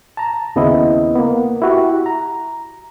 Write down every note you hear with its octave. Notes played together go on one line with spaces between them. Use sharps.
A5 A#5
D#2 C#3 B3 C4 E4 D#5
A#3 B3
E4 F#4 G4
A#5